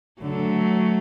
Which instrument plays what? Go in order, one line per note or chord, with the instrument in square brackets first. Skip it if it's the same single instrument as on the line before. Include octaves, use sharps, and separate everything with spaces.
[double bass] D3 [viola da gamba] F#3 A3